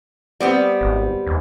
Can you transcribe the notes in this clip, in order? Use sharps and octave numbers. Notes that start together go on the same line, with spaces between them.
G3 B3 C4
G#1
D#2